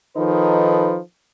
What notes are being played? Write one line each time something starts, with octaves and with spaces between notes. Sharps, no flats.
D#3 F3 D#4 A4 B4